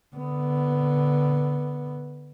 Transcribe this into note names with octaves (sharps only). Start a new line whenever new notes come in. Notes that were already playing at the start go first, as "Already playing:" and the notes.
D3 B3